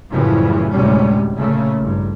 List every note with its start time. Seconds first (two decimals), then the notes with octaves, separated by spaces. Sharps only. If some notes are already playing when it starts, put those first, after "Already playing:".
0.10 F#2 A2 C#3 E3 F3 G3
0.72 D2 A2 C3 G3 G#3 C#4
1.37 A#2 C#3 A3
1.80 A1 G2